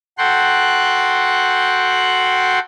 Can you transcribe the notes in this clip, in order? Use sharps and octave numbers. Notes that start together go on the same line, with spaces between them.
F#4 A4 F#5 G5 C6 F#6